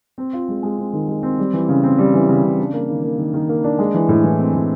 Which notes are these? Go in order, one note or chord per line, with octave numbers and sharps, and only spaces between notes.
C4
F4
G#3
G#3
C4
D#3
G#3
C4
G3
E3
C#3
C4
G3
E3
C#3
C#3
D4
A#3
D#3
A#3
D#3
D#3
A#3
D4
G#3
E3
A2
E3
C4
A2